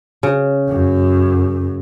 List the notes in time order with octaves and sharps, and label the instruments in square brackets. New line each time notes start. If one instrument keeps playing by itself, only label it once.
[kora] C#3
[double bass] F#2